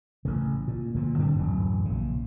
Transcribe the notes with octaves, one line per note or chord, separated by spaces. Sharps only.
A1 C#3
A#2
A#2 D3 F3
G2 D3 G3 C4
D1 F#2 E3 F#3
A#1 C#3